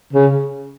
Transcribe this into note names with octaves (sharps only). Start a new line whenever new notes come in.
C#3